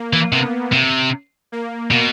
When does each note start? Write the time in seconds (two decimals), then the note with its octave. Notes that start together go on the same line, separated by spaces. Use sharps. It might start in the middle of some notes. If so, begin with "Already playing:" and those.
Already playing: A#3
0.13 E3
0.32 C3 B3
0.72 C3
1.52 A#3
1.91 B2